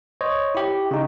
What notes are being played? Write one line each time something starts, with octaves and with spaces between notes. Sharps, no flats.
C5 C#5 D#5
E4 G4
C#3 D#4